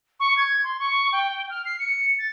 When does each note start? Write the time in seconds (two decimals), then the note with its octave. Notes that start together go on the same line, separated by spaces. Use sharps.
0.20 C#6
0.37 G#6
0.64 C6
0.79 C#6
1.12 G5
1.50 F6
1.65 C7
1.79 C#7
2.19 A6